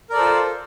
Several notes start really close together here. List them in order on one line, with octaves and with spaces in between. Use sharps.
A#4 D5 A4 C5 F4